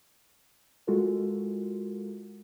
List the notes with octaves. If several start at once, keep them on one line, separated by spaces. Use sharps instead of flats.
G#3 F4 F#4 A4 A#4